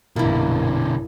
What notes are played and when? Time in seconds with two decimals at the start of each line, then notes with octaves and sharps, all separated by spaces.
0.16 A#1 F#2 B2 D3 A#3 E4